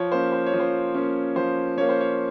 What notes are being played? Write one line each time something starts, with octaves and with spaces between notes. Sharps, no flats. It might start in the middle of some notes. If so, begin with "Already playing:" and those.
Already playing: F3 C#5
A#3 C#4 C5
C5
C#5
F3
C5
A#3 C#4
F3 C5
A#3 C#4 C#5
C5
C#5